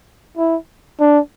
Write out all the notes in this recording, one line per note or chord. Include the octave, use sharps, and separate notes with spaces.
E4
D4